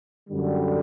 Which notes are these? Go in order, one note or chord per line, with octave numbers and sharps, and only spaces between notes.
F#2 D3 G3